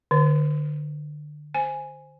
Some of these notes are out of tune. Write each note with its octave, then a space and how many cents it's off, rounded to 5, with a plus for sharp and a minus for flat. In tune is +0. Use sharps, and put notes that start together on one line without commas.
D3 +25 C5 +0
C5 +0 G#5 +0